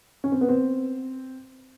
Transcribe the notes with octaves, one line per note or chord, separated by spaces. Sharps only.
C#4
C4
B3
C4